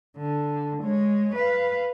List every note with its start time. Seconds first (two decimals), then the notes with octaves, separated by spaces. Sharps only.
0.17 D3
0.83 G#3 C#5
1.36 B4 F5